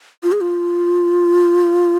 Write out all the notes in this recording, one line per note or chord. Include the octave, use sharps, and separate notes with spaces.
F4
G#4
F4